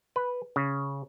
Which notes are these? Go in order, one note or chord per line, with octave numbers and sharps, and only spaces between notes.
B4
C#3